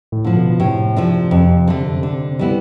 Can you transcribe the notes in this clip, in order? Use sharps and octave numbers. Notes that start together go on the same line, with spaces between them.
A2
D3 F3
B2
A2 C3
F3 A3 D4
F2
D3 A3
D3
G3 B3 E4